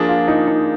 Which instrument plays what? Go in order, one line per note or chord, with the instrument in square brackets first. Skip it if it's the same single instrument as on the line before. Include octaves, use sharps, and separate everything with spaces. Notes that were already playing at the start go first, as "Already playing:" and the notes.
Already playing: [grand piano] F3 A#3 D4 [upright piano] G#4
[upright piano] F4
D#4
D#4